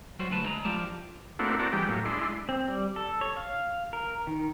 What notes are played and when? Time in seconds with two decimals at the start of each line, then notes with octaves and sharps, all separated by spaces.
0.19 F#3 G3 F#4 C5
0.31 D2 F#3 B4 A5
0.46 G#3 A#5
0.65 F3 F4 G4 D5 A5
1.39 A3 A#3 C4 D4 E4 F#4
1.59 C4 F#4 D5 A5 A#5
1.73 E3 G3 G#3 G4
1.89 A2 F#3 A#3
2.05 G#3 D4 E4 C6
2.49 C4
2.68 G3
2.96 A4
3.21 C#5
3.37 F5
3.93 A#4
4.27 D#3